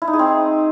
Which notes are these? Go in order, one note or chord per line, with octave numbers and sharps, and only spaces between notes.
E4
D#4
G#4
C4